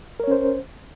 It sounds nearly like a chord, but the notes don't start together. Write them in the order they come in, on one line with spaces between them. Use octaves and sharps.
A#4 C#5 C#4 C5